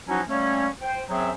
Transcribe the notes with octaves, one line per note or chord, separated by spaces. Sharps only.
F3 F#3 C#4 D#4 E4 F#4
G3 A3 A#3 C#4
C5 G5
F#2 F#3 C4 G#4 C5 E5